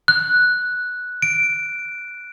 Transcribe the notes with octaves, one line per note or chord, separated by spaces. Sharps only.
F#6
D7